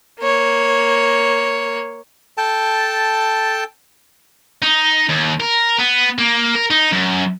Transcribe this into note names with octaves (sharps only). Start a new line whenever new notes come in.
A#3 C#5
A4 G5 A5
D#4
D#2
A#4
B3
A#3
A#4
D#4
F#2